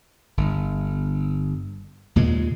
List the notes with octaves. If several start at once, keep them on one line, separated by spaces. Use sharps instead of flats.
G1
D#2 A#2 C#3 G#3